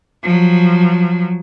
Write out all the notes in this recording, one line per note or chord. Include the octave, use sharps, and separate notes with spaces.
F3 F#3